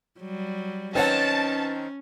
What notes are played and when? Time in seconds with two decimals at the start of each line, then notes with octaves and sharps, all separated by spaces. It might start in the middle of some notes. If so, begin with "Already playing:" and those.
0.20 F#3 G3
0.95 D#3 C4 C#4 D#4 B4 C#5 F#5 A5